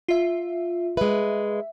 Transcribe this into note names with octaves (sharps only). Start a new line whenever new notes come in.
F4 E5
G#3 B4 E5